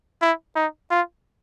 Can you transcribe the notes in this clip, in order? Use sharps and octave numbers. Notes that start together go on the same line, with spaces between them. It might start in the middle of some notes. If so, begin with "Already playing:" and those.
E4
D#4
F4